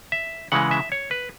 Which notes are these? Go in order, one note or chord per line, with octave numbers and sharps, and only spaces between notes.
E5
C#3 E3 G#3 F#5
E5
C#5
B4